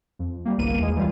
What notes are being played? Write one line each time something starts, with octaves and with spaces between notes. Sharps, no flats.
F2
G3 A#3
G#1 C#2 A#3 B3 D#7
E2 G#3
E3 G3 F4